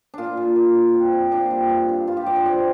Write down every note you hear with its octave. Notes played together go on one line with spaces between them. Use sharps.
A#2 D4 F4
A#2
A#2
D4
C4
C4
A#2 D4
G3
G2
G2
G2 F4
G4
G2 D5
C5
C4 D5